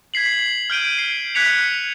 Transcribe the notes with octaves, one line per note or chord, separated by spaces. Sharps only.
G#6 B6 C7 F#7
F6 G6 D7 D#7
C7
F#6 G#6 B6 C#7 F7